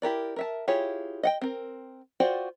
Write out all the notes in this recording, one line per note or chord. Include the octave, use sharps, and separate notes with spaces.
E4 G4 A#4 D5
A#4 E5 A5
E4 F4 G4 G#4 C#5
D#5 F#5 G5
C4 A#4
F4 F#4 C5 D5 G5